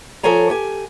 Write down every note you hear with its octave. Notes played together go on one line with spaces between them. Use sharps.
F3 A4 C5 C#5 G#5 A#5
G4 G#5